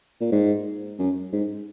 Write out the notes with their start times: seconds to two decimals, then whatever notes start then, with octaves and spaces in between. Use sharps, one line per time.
0.21 A#2
0.32 G#2
0.99 F#2
1.33 G#2